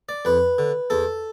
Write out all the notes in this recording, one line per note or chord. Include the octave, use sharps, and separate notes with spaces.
D5
F2 B4
D3
E2 A4